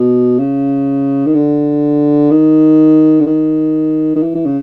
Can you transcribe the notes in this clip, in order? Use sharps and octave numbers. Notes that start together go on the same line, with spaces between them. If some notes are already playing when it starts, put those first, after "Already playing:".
Already playing: B2
C#3
D#3
D3
D#3
D3
D#3
D#3
E3
E3
C#3